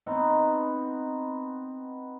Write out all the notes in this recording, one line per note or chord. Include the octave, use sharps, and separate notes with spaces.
B3 C4 D#4